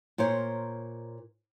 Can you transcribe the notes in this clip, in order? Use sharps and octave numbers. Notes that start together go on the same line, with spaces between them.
A#2 A#4 C5 C#5